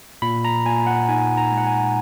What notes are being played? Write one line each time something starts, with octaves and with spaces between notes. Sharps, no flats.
A#2 B5
A#5
A#2 G#5
F#5
D#4 G#5
A#5
G#3
F#5
G#5